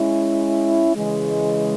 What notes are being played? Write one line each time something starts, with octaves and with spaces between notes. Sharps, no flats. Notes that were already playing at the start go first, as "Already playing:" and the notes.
Already playing: G#3 C#4 E4
C#3 E3 G#3